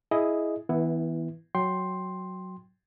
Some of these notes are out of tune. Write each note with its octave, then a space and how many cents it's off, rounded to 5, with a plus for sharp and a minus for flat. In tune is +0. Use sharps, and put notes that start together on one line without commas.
E4 +0 G#4 +10 D#5 +0
E3 -30 B3 +0 E4 +0
F#3 +0 G5 +0 C6 +10